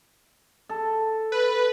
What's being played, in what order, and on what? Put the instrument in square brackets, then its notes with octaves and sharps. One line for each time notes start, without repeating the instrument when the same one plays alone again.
[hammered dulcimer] A4
[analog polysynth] B4